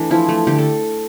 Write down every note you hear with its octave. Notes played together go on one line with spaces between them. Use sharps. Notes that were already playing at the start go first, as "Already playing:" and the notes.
Already playing: E3 A3 D4
F3 E4
A3
D3 G4
A4